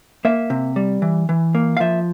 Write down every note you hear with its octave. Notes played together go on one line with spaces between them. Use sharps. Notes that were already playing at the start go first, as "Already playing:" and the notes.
A#3 E5
C3
G3
E3
E3
A#3
F5
F3 E5